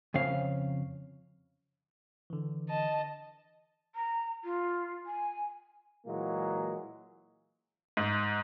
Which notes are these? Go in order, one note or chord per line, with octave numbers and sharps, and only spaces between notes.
F2 C#3 C#4 F5
D3 E3
D#5 A5
A#5
F4
G#5
A#2 E3 F#3 G#3 A#3
G#2